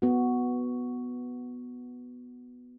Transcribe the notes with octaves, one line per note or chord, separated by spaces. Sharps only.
B3 F#4